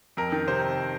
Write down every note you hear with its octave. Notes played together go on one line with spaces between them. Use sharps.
F2 A#4
D#3
C3 C5